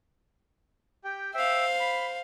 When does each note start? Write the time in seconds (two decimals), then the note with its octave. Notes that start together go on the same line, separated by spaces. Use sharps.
1.04 G4 G5
1.34 C5 E5 F5 G5
1.80 B5